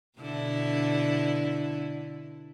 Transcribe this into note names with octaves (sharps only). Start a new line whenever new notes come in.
B2 D3 E4